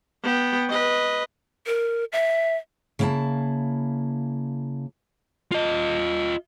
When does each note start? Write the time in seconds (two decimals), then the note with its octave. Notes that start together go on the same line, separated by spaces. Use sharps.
0.23 B3 G5
0.69 B4 D#5
1.67 A#4
2.12 E5
2.99 C#3 A#3 E4 F5 A5
5.52 F4 D#5